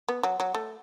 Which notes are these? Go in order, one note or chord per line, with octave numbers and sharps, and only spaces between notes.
B3
F#3
F#3
A3